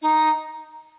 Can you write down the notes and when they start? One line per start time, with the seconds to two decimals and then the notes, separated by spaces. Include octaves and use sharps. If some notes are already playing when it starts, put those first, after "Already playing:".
0.02 D#4